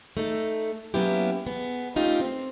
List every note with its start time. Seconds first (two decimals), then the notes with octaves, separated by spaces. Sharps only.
0.17 A3 D#4 A4
0.94 F#3 A#3 B3 C#4 E4 G4
1.47 B3 G#4
1.96 A3 C#4 D#4 F4 G4
2.20 C4